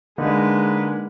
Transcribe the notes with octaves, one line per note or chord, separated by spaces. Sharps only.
D3 G#3 A#3 D#4 B4